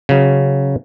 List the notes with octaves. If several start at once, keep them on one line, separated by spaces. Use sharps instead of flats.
C#3 F#3